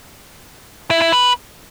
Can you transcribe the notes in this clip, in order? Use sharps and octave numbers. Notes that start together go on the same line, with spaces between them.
E4
E4
B4